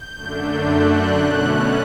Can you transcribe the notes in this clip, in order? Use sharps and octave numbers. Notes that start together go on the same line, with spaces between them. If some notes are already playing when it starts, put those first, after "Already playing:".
Already playing: G6
F#2 D3 A3 D4
F#6
B2 A3 C#4